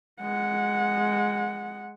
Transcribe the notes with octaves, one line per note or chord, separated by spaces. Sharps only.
G#3 F#5